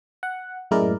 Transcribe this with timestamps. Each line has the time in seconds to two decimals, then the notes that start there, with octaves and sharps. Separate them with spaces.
0.23 F#5
0.71 F#2 A2 G#3 E4 A#4 D5